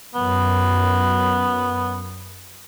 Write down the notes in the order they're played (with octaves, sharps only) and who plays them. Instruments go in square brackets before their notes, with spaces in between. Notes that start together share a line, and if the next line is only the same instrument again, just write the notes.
[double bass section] F#2 [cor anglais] B3